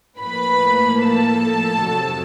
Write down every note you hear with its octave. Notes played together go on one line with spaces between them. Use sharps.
A2 F3 A#3 B4 B5
A4 A5
F2 C3 D#3 F#3